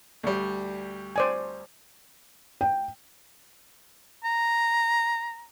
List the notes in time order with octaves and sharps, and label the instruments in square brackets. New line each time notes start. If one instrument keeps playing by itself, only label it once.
[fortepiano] D2 G3
[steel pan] C5 D5 G#5
[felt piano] G5
[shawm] A#5